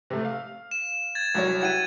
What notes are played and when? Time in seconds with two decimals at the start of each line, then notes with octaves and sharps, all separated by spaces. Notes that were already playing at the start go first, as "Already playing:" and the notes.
0.10 C3 A3
0.25 F5
0.71 E7
1.15 G#6 A6
1.35 C2 F#3 C#5
1.62 E4 F#4 G4 G#6 D#7